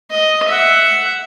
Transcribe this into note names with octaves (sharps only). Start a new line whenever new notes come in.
D#5
E5 F#5